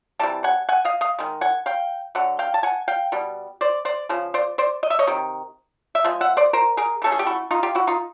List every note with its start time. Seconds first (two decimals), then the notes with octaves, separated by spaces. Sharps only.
0.19 C3 E3 G3 A5
0.44 F#5 G#5
0.69 F#5 G#5
0.85 D#5 F5
1.01 D#5 F5
1.19 D#3 G#3
1.41 F#5 G#5
1.66 F5 G5
2.15 D3 F#3 F#5
2.39 F5 G5
2.54 A5
2.63 F#5 G#5
2.88 F5 G5
3.12 B2 G3
3.61 C5 D5
3.85 C5 D5
4.09 C#3 F3
4.34 C5 D5
4.58 C5 D5
4.83 D#5
4.90 E5
4.99 C#5 D#5
5.07 C3 D#3
5.95 E5
6.04 F3 G#3
6.21 E5 F#5
6.37 C5 D5
6.53 A#4 C5
6.77 G#4 A#4
7.02 E3 A3 C#4 A4
7.12 G#4
7.19 G4
7.27 E4 F#4
7.51 D#4 F4
7.63 F4 G4
7.75 E4 F#4
7.87 D#4 F4